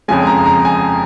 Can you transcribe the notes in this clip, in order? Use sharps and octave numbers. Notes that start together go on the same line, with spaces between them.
F2 C#3 F3 G#3 G#5
A#5
A#5
G#5